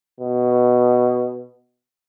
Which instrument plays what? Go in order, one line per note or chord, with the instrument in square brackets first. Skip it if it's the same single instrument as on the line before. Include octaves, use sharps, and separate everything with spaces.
[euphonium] B2